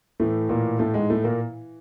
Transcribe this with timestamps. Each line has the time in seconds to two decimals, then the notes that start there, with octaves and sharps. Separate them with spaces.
0.20 A2 E3 A3
0.49 A#2 A#3
0.79 A2 A3
0.94 G#2 G#3
1.10 A2 A3
1.24 A#2 A#3